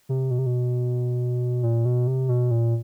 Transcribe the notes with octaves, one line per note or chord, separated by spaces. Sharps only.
C3
B2
C3
B2
A#2
B2
C3
B2
A#2